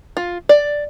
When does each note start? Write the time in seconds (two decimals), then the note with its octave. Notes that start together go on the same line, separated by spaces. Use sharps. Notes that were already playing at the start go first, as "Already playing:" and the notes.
0.17 F4
0.49 D5